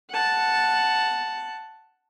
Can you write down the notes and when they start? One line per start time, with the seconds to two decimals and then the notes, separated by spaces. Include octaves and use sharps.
0.11 F#5 A5